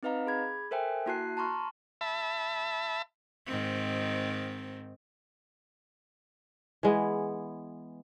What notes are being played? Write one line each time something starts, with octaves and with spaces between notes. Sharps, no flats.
C4 D#4 B4 D#5 F5 A#5
G#4 B5 G#6
A4 A#4 C5 E5 G5 G#5
A#3 E4 F#4 A5 F#6 C7
A5 A#5 C6 C#6 F6
E5 A5 B5
G#2 D#3 C4
E3 G#3 B3